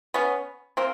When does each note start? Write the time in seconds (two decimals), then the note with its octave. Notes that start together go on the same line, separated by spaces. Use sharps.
0.14 B3 C#4
0.77 A#3 C4